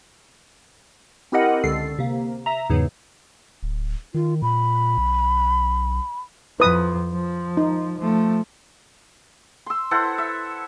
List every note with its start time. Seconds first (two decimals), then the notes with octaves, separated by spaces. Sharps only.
1.32 C4 E4 G4 A#4 D#5 F#5
1.64 C#2 D3 A4 C7
1.98 C3 A#3
2.46 E5 A#5
2.70 E2 G#2 C#3 E3 F#3
3.63 D1
4.14 D#3 F4
4.42 A#2 B5
4.98 B1
6.60 F2 F3 B4 D#6
7.13 F3
7.57 D#4
7.99 F3 A3
9.66 C6 E6
9.91 E4 A4 C5 F#5
10.18 E5